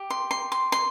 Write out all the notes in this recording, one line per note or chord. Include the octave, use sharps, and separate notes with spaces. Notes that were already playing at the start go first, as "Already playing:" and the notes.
Already playing: G4
C6
C6
C6
C6